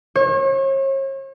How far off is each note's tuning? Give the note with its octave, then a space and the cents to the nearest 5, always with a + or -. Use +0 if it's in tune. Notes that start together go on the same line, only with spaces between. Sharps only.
C#5 -40